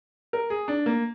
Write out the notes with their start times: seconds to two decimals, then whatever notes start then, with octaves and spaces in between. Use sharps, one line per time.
0.33 A#4
0.50 G#4
0.68 D4
0.86 A#3